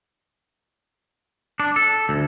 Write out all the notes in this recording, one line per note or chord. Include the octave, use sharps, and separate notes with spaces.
D4
A4
D2